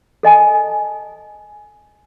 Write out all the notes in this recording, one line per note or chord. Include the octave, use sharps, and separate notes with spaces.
A4 D#5 G#5 A5